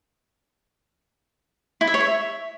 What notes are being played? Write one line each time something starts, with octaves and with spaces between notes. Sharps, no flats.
E4
E5
C#5
E5